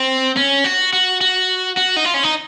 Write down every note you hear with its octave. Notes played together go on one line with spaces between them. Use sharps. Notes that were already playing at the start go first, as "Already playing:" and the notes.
Already playing: C4
C#4
F#4
F#4
F#4
F#4
D#4
F4
C#4
D#4